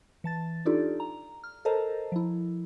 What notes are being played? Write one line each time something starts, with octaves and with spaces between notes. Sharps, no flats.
E3 A5 A6
D4 D#4 F4 G4 A4 D5
A#5
F6
A4 A#4 C5 D#5 A5 A#5
F3 E4